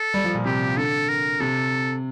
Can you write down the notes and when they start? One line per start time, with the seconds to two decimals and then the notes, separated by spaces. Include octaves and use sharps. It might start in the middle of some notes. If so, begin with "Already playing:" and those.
Already playing: A4
0.14 G3
0.24 F3
0.35 A#2
0.45 C3 G4
0.77 D3 A4
1.09 A#4
1.40 C3 A4